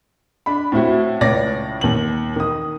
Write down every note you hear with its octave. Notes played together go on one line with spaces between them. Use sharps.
D4 B5
A2 C4 E4 F#4
C#2 A2 C#5 D5 A#6
D#2 F#7
D#3 D#6